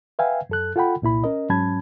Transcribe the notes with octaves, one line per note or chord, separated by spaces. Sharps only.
B4 E5 F5 G5 G#5
F#2 A4 F#6
F4 A4 F#5 G5 B5
C2 A#2 E4 B5
C#4 A#4 D#5
G#2 F#3 C#4 A5 B5 G#6